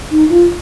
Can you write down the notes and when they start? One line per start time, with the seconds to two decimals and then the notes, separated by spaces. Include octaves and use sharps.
0.11 D#4
0.29 F4